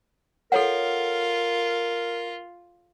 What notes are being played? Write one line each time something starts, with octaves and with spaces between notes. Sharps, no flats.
F4 A4 A#4 C#5 F#5